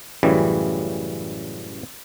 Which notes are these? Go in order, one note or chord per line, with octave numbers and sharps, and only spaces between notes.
A1 F#2 C#3 E3 G3